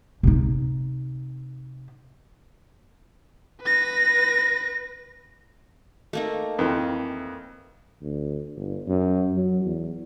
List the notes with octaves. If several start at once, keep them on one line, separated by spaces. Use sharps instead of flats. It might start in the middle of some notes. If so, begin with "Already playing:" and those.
C3 D#4
B4 A#6
A3 A#3 D#4
F2 D#3 E3
D2
G1
F#2
F#3
E2